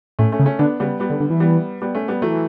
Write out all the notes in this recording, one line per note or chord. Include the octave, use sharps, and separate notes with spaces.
A2 A3 C#4
A3 C#4
C#3
A3 C#4
D3 B3 D4
C#3 G3 B3
G3 B3
D3
D3
E3
G3 B3
G3 B3
A3 C#4
G3 B3
E3 F#3 A3